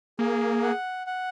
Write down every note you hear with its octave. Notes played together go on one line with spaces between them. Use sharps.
A#3 G#4
F#5
F#5